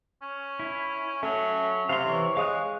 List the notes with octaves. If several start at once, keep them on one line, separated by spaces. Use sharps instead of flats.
C#4
E4
F#3 A3 C#4
C3 F5 C6
E3 C#5
G#3 F5 D#6 F#6